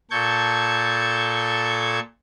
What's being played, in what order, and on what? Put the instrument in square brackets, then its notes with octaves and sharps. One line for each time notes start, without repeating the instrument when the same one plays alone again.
[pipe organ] A#2 A4 A5 C#6 G6 G#6